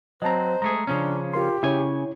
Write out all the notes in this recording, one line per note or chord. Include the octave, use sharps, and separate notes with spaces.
F#3 C4 C5 D#5 A5 A#5
G#3 A3 G#4 A#5
C#3 F3 C#4 D4
F4 G4 A#4 C6
C#3 E4 C#5 G#5